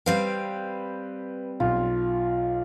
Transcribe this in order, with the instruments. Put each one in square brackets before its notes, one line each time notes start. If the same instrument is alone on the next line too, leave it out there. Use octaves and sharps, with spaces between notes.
[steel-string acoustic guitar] G3 C4 F5 [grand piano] B4
[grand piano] B1 [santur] F4